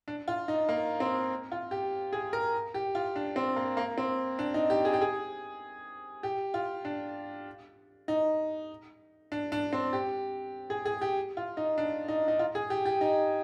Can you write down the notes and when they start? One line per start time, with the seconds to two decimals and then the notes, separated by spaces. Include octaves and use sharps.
0.08 D4
0.28 F4
0.48 D#4
0.69 A#3
1.00 C4
1.52 F4
1.71 G4
2.13 G#4
2.33 A#4
2.74 G4
2.95 F4
3.16 D4
3.36 C4
3.56 A#3
3.77 A#3
3.98 C4
4.39 D4
4.54 D#4
4.70 G4
4.85 G#4
4.93 G4
5.01 G#4
6.23 G4
6.54 F4
6.85 D4
8.08 D#4
9.32 D4
9.52 D4
9.73 C4
9.93 G4
10.70 G#4
10.85 G#4
11.01 G4
11.37 F4
11.57 D#4
11.78 D4
12.08 D#4
12.28 D#4
12.39 F4
12.55 G#4
12.70 G4
12.85 G4
13.01 D#4